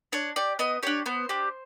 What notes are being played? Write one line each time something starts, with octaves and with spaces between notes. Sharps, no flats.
D4 C#5
G4 D5
B3 D#5
D4 G4 C#5
B3 C5
D4 G4